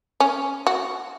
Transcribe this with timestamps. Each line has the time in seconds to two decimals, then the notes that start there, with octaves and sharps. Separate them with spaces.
0.20 C#4
0.67 F#4